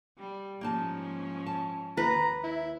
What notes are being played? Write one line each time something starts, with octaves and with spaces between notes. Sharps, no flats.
G3
G#2 F3 A#3 C#4 D#4 A5
A5
D#2 B4 A#5
E4